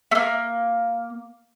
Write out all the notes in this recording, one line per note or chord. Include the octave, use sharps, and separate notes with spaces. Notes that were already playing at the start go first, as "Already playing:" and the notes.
A3 A#3